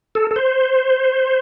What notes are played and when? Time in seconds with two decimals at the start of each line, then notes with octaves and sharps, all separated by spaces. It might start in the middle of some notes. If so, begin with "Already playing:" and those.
0.15 A4
0.31 A4
0.36 C5